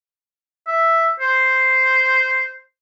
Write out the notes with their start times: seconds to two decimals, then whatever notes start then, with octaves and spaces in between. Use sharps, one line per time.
0.68 E5
1.20 C5